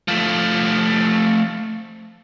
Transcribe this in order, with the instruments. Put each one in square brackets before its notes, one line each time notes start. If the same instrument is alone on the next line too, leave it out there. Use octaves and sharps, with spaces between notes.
[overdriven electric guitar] F3 A3